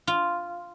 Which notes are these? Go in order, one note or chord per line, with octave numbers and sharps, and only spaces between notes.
F4